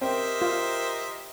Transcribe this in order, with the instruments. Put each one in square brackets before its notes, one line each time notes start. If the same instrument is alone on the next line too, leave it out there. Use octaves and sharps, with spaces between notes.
[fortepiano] C4 [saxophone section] G4 A#4 [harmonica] C5 D#5 E5
[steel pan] F4